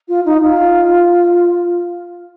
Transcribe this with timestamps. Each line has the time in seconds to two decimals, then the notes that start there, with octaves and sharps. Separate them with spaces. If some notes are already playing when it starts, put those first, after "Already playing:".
0.08 F4
0.25 D#4
0.42 F4